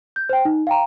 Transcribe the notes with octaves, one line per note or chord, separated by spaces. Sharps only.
G6
C5 G5
D#4
F5 G5 A#5